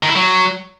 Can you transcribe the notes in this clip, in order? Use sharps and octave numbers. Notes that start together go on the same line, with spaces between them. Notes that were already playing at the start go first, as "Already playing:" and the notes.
D#3
E4
F#3